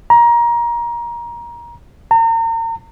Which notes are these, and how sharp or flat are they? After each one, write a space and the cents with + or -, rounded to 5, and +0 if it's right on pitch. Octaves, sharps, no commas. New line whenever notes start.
A#5 +20
A#5 -40